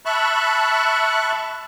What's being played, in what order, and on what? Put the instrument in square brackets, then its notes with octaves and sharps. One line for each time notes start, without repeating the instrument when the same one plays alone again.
[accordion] E5 A5 B5 C#6 F#6